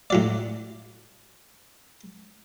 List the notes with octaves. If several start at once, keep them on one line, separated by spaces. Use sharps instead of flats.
A2 F#3 D5